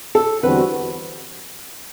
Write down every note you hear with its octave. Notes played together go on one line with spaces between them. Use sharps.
A4
E2 D3 G3 C4 F#4 B4